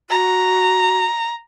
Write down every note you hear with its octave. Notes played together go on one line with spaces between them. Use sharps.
F#4 A#5